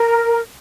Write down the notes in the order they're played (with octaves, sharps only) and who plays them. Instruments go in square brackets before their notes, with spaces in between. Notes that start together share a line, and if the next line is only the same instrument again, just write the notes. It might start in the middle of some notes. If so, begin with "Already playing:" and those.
Already playing: [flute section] A#4